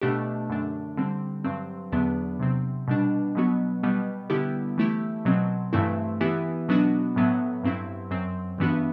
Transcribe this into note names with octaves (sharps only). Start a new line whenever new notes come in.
B2 A3 D4 G4
F#2 D3 A3 D4
D3 G3 C4
G2 F#3 C4
E2 D3 F#3 B3 D4
C3 F#3 C4
B2 G3 D4
B2 F#3 B3 F#4
B2 G3 B3
D3 G3 B3 E4 G4
E3 A3 E4 G4
B2 F#3 C4
G2 E3 A3 C4 E4
E3 B3 E4 G4
B2 F#3 B3 D4 F#4
A2 F#3 B3
G2 F#3 C4 E4
F#2 F#3 C4
G2 E3 B3 D4 F#4